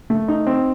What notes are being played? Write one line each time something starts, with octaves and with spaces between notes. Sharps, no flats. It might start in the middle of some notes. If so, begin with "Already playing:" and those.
A3
D#4
C4